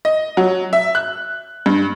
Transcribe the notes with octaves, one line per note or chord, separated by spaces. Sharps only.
D#5
F#3
E5
F#6
G2